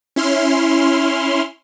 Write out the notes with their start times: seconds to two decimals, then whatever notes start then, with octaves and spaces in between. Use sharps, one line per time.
0.16 C#4 E4 C6 F6